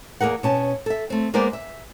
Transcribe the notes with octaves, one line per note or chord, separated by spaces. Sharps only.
E2 A#3 G#4 A#4 F#5
B2 C#4 A5
A4 E5
A3 C4
G#3 A#3 B3 A#4 C5 D5
E5